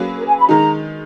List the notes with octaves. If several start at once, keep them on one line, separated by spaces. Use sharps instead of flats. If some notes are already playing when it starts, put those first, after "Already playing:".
Already playing: F#3 A#3 C#4 G#4 B4
A#4
G#5
B5
D#3 G#3 D#4 A#5